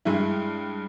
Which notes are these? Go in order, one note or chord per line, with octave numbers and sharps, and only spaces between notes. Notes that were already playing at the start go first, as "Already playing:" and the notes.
G2 G#3 E4